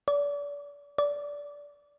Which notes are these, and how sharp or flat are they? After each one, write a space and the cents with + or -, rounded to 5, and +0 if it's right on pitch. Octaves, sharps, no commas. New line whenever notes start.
D5 -35
D5 -20